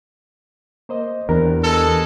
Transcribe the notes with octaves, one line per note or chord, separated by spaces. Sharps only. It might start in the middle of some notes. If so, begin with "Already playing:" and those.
A#3 C5 D#5
E2 D4 G4 A#4
G#3 A4